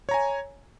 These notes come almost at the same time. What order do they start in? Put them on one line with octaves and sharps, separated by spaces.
C#5 A#5 G#5